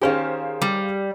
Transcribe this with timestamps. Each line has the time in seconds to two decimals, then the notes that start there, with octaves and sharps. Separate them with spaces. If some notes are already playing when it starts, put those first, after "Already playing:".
0.01 D#3 C#4 G4 G#4 C5 F5
0.62 G3